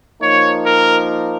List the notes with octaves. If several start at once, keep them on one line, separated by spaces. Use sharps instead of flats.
F3 A#3 D#4 C#5
A#4